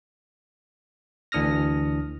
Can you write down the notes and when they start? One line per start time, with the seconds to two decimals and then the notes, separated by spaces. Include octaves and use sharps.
1.32 D2 E3 D4 D#6 F6 A#6